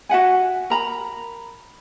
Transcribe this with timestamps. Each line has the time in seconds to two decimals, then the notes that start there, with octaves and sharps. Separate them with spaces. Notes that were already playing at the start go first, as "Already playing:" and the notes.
0.09 F#4 E5 F#5 G#5
0.70 A#4 A#5 B5